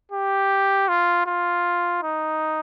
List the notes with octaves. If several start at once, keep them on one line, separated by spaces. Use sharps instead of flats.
G4
F4
F4
D#4